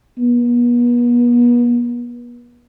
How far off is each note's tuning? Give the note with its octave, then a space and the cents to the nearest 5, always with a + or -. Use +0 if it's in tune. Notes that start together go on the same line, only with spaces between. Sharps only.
B3 -40